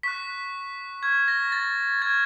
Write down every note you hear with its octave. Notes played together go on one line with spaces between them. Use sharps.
C#6 F#6 B6
C#6 F6 G#6
A#6
A6
C#6 F6 G#6